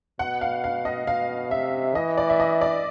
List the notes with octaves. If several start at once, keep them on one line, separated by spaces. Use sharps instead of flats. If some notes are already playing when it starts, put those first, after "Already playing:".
B2 F#5
F5
F5
D#5
B2 F5
C3 E5
E3 D#5
D5
E5
D#5
D5